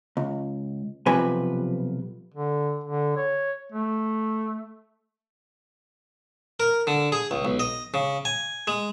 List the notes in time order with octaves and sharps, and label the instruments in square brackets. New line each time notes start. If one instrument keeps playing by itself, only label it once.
[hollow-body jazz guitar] C#2
B1 C3 F3 B4 G#5
[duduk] D3
D3
C#5
A3
[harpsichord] A#4
D3
G#4
C#2
B1
D#5
C#3
G#5
G#3